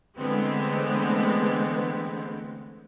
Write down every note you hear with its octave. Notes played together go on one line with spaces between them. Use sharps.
D3 E3 G#3 A3 B3 C4